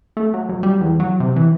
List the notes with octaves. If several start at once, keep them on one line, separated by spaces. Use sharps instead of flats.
A3
F#3
F#2
G3
E2
F#3
C3
E3